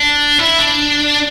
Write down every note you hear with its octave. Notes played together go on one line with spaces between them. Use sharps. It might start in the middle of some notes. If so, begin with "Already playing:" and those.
Already playing: D4
E4
D4